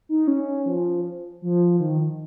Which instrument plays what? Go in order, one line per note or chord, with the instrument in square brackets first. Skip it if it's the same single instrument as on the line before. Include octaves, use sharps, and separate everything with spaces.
[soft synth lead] D#4
C#4
F3
F3
D#3